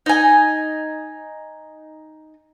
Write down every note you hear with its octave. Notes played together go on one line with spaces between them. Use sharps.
D#4 G#5